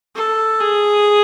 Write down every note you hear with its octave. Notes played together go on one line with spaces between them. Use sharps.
A4
G#4